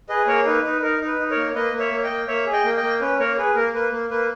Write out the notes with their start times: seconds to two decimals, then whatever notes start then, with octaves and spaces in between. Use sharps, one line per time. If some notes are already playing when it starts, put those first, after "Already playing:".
0.09 G#4 B4 D#5
0.27 A#3 A#4 C#5
0.46 D#4 B4
0.64 D#4 B4
0.82 D#4 A#4
1.01 D#4
1.07 B4
1.18 D#4
1.30 A#4 C#5
1.37 A#3
1.55 A#3 B4 D#5
1.73 A#3
1.79 C#5 E5
1.92 A#3
2.04 D#5 G5
2.10 A#3
2.28 A#3 C#5 E5
2.47 G#4
2.53 D#5 G5
2.65 A#3
2.77 D#5 G5
2.83 A#3
3.01 C#4 B4
3.19 A#3 A#4 C#5
3.38 G#4 B4
3.56 A#3 A#4
3.74 A#3 B4
3.92 A#3
4.10 A#3 B4